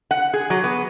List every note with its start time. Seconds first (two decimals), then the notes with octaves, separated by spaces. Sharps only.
0.11 F#5
0.34 G#4
0.50 F#3
0.64 B3